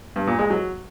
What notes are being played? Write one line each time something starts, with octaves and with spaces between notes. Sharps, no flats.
G2
A#2
G#3
F#3